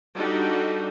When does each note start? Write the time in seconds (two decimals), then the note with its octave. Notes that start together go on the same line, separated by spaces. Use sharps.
0.17 G3 D4 D#4 F#4 G4 A4